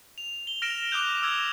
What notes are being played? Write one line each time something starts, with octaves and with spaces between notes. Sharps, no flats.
F7
G7
F6 A#6 D7 E7 F7
D6 D#6 F#6 G6 F7
D6 E6 F6 G#6